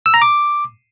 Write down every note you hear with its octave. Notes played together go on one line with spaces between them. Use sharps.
E6
A#5
D6